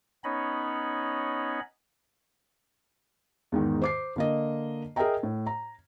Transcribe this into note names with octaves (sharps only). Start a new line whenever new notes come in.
B3 C#4 D#4 C#5 D#5 B5
E2 G#2 D#3
C5 D6 C7
D3 A#3 D#5
G#4 A#4 D#5 E5 G5 A#5
A2
A#5